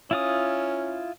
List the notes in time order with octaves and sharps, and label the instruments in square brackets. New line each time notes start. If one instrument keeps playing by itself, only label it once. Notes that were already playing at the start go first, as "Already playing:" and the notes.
[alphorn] C#4 [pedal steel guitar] E4 F4 D#6